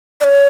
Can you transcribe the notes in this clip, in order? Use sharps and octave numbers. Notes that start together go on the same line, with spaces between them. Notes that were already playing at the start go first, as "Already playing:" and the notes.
D5
C#5